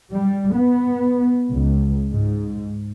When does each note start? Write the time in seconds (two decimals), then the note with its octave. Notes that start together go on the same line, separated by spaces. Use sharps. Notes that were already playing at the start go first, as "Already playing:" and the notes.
0.12 G3
0.55 B3
1.51 C#2
2.10 G#2